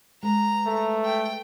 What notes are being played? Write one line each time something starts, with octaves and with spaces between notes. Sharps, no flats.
G#3 B4 A#5
A3
G5